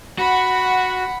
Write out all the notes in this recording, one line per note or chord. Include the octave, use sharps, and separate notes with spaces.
F#4 F#5 B5